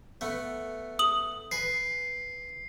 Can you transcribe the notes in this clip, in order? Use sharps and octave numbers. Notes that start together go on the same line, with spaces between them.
A3 B3
D#6 F#7
B4 G#5 C7